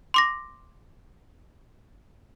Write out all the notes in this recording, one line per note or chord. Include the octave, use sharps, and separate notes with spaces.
C6 D6 A#6